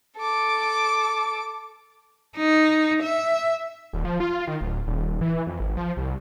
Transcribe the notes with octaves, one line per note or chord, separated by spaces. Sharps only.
A4 D6
D#4
E5
D#1
F3
F4
D#3
D1
D#1
E3
F2
G#1
F3
C2